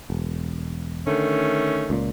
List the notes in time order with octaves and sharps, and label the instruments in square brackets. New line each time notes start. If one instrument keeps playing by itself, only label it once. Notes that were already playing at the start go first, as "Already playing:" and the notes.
[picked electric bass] E1
[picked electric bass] D3 [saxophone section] D#3 A3 C#4
[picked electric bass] C#2 A#2